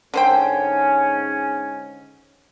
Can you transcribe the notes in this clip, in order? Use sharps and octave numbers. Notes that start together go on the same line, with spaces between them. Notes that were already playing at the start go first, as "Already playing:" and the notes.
G#2 D3 C#4 C5 G5